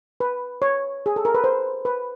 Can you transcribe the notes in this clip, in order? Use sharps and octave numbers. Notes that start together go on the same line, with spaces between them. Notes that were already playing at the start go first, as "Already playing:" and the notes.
B4
C#5
G#4
A4
A#4
B4
C5
B4